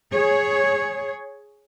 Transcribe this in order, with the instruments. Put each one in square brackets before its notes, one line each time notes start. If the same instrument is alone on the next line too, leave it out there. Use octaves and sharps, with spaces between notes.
[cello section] G#4 C#5